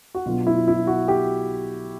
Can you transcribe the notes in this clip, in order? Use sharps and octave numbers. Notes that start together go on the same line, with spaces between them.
F#4
B2 F#3 B3 D4 F4
E4
E4
F#4
G4